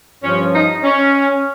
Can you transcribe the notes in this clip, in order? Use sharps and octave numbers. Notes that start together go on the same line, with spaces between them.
G2 F3 C#4
D#4
C#4